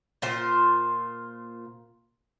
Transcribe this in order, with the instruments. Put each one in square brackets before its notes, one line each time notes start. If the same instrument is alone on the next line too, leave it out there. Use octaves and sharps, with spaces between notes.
[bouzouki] A#2 F4 C5